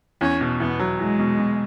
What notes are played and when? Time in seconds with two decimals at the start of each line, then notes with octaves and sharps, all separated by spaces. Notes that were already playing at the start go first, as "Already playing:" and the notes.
0.21 E2 C#4
0.41 B2
0.60 E2 B3
0.79 F#3
0.99 E2 G#3
1.19 B2
1.38 B2